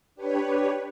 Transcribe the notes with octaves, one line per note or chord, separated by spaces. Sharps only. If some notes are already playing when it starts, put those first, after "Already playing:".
D4 G4 B4 C#5